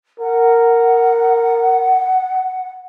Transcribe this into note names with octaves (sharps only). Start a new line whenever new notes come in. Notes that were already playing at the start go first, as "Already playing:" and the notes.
A#4 F#5